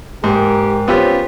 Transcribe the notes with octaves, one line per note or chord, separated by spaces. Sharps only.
G#2 G4 A#4
B3 C#4 F4 G4 C5